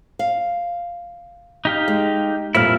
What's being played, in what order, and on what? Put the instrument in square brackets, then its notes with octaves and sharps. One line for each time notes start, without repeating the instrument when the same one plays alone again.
[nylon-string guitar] F5
[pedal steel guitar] D#4 G4 F5
[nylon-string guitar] G#3
[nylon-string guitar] F2 A#2 G3 [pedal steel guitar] E4 F6